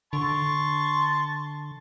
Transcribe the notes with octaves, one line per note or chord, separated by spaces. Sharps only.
D3 A5 C6 C#6